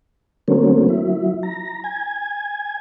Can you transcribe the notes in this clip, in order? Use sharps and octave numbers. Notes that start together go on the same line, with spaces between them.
D3 F#3 A3 A#3 C4 C#4
F#3 E4
A#5
G#5